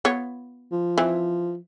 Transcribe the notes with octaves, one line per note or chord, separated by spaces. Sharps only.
B3 F4 C#5
F3
E3 C4